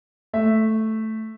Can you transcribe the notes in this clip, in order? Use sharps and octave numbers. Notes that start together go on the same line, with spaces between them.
A3 E5